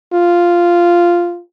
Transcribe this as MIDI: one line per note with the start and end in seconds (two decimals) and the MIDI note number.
0.13 1.40 65